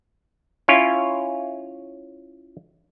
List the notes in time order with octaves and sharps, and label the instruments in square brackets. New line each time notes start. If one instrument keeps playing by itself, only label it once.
[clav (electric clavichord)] C#4 E4 F4 C#5